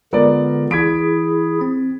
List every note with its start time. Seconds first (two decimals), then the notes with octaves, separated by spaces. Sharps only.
0.13 D3 G#3 B3 F4 A#4 D5
0.71 E3 E4 G#4 G#6 B6 D7
1.61 C4